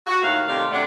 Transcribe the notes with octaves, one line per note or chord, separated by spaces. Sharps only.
F#4
D#2 A2 F5
A2 C3 D#3 D4 G4 F5
F#2 C3 A3 D4 F#5